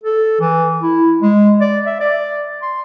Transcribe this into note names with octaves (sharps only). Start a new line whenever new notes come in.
A4
E3
E4
G#3
D5
E5
D5
C6